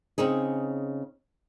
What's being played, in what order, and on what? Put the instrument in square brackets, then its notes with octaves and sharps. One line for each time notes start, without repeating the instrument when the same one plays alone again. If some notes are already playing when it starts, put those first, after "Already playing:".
[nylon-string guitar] C#3 C4 D#4 G#4